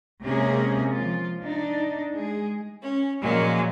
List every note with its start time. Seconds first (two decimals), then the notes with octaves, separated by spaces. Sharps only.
0.23 C3 G#3 A#3 C#4 G#4
0.92 F3 F4
1.42 D4 D#4
2.14 G#3 G#4
2.82 C#4
3.21 A#2 F3 F#3 G#3 A#3